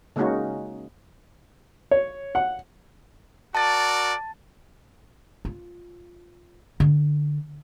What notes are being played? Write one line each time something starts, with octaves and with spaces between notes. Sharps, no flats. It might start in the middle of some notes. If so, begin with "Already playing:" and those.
C#3 G#3 A#3 C#4 D#4 F#4
C#5
F#5
F#4 A#4 D5 A5 A6
F4
D3